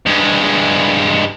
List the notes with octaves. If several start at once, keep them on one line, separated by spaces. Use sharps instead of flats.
G2 G#3